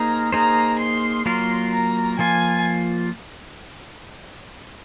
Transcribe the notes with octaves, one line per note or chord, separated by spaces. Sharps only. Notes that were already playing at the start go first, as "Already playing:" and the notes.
Already playing: A#3 D#4 G#4 C5 F5 A#5
A#3 D#4 G#4 C5 A#5
C6
F#3 A#3 F4 A#4 C6
A#5
F3 A#3 F4 G#5